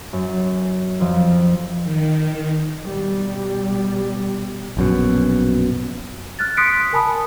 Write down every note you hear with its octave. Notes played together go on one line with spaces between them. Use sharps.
F#2
F2 F3
D#3
B2 G3
A#1 F#2 B2
F6 F#6 A6
C6 D#6 F#6 B6 C#7 D7
A#4 G#5 A5 B5 D#6